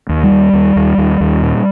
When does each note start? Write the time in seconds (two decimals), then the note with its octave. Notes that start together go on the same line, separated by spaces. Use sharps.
0.09 D#2
0.24 G3
0.31 D#2
0.53 D#2
0.76 D#2
0.98 D#2
1.21 D#2
1.43 A#2